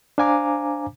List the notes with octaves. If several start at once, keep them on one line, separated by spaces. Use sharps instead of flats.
D4 C5 F5 G#5 A#5 D6